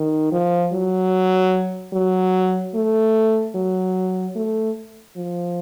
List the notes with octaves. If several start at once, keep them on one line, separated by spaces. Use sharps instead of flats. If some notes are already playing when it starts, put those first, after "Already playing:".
Already playing: D#3
F3
F#3
F#3
A3
F#3
A3
F3